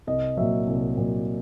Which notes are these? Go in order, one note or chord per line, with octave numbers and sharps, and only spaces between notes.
C2 D#5
A#2 F#3 E5
C2
A#2 F#3